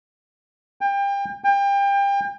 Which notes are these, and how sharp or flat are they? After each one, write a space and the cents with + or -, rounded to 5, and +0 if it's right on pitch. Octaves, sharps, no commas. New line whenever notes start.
G5 +30
G5 +30